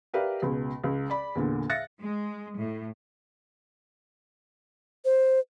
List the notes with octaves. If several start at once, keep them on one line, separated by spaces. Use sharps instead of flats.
G4 A#4 B4 D5 E5 F5
C#2 B2
C#2
D5 B5
E2 A#2 D3
E5 F5 F#6 A6 A#6 C#7
G#3
A2
C5